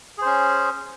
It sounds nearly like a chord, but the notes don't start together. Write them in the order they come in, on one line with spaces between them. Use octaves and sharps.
G#4 C5 C#4